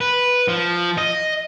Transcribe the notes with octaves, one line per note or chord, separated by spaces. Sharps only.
B4
F3
D#5